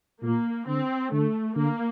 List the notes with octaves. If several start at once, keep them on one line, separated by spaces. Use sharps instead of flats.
A#2 A#3
D3 C4
D3 A3
D3 A#3